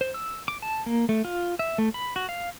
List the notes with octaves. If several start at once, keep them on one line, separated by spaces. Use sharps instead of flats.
C5
E6
D6
A5
A#3
A3
F4
E5
A3
B5
F#4
F5